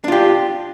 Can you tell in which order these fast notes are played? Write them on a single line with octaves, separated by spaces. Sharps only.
D4 F4 G4